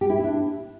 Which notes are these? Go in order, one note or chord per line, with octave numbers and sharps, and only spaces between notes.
G4
E4
E4
D4